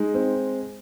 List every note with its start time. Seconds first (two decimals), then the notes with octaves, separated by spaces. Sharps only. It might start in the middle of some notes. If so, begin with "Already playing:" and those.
Already playing: G#3 D#4
0.14 C4